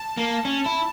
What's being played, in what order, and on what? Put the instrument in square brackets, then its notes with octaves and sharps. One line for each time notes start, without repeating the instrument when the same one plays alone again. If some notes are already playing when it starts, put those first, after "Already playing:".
Already playing: [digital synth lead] A5
[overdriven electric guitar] A#3
C#4
E4